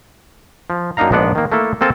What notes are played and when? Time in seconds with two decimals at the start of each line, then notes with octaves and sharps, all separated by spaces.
0.70 F3
0.97 F#2 A#3 D4 D#4 F5 A#5
1.11 A#1 G#2 G#3 B3 D4 F#5
1.35 D#3 A#3
1.52 A3 A#3 E4 A4
1.81 A#3 C4 A4 A#4 G#5 A5